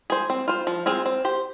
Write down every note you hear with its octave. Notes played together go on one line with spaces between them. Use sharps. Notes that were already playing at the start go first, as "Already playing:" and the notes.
G#4 C5
C4
F4 C5
F3
C4 F4 G#4 C5
C4
G4 C5